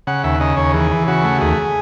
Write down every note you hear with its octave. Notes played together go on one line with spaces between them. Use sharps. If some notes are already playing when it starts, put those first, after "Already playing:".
C#3 F#5
D#2 E5
C#3 D#5
D#2 C#5
E3 G#4
E3
C#3 F#4
A3
D#2 G#4